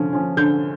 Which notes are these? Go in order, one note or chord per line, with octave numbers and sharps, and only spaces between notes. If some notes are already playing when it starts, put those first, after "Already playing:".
Already playing: D3 F3 C#4
F3 C#4
D3 G6